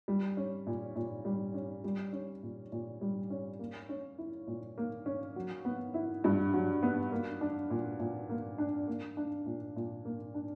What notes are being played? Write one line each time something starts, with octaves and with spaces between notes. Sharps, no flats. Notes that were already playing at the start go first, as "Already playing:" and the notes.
G3
C#4
A#2
A#2
G3
C#4
G3
C#4
A#2
A#2
G3
C#4
A#3
C#4
E4
A#2
A#3
C#4
F#3
B3
E4
G2
F#3
B3
A#3
D4
A#2
A#2
A#3
D4
A#3
D4
A#2
A#2
A#3
D4